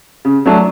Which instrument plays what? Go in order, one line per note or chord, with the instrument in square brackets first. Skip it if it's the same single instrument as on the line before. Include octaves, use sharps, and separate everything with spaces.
[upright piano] C#3
F#3 A3 D4